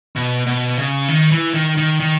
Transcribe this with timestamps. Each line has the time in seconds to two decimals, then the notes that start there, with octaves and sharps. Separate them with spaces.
0.16 B2
0.46 B2
0.77 C#3
1.08 D#3
1.32 E3
1.54 D#3
1.77 D#3
2.00 D#3